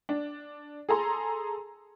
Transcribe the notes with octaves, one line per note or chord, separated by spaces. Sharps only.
D4
G#4 A4 A#5 C6